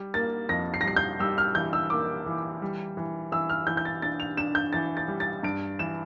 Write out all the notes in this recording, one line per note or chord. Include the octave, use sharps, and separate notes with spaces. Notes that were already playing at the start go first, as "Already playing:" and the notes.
Already playing: G3
A#3 A6
F2 A#6
C7
A#6
G3 C7
G6
G3 E6
F6
E3 G6
E6
A#3 D6
E3
G3
E3
E3 E6
F6
E3 G6
G6
A6
D4 A6
F7
D4 E7
G6
E3 A6
A6
G3
A6
G2 D7
E3 E7